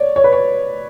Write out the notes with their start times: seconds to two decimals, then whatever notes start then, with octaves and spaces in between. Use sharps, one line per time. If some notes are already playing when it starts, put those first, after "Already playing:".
Already playing: C#5 D5
0.16 C#5
0.24 B4
0.32 C#5